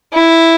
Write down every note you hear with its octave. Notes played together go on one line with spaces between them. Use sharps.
E4